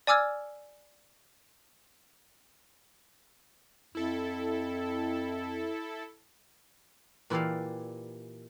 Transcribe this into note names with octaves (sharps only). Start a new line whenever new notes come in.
D5 G#5 D6 E6 F6 G#6
F2 E4 A4
A#2 E3 E4 G4 D5 F5